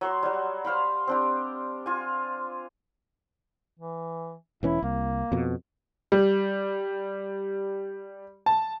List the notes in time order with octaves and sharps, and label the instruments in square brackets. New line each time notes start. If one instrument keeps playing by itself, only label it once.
[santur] F#3 C#5 C6
F#3 G3
C5 F5 G5 B5
C4 D4 G4
F4 G#5
[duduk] E3
[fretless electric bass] E1 E3 C#4 [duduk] E4
[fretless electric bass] C2 [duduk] A#3
[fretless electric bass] F2 B2
[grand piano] G3
A5